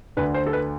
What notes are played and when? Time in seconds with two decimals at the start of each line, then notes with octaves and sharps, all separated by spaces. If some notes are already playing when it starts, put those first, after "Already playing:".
0.17 D2 D3 B4
0.34 C5
0.46 A4
0.53 B4